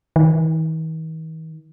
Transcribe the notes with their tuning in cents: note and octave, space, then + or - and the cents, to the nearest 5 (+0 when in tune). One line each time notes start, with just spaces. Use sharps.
D#3 +45